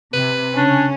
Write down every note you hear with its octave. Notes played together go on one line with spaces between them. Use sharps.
C3 B4
C#3 C#4 D4